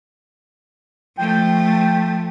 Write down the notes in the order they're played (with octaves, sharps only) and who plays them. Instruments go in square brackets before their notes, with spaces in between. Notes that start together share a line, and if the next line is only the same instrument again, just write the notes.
[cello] F3 A3 [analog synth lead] G5